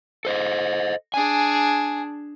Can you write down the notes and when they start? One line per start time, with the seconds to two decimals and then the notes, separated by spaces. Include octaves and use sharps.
0.25 A4 C5 D#5
1.14 D4 G#4 G#5